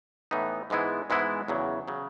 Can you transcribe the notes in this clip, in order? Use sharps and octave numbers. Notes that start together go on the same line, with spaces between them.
A2 E3 B3 D#4
G#2 E3 G#3 B3 E4
G#2 E3 G#3 B3 E4
E2 C#3 F#3
C#3 F#3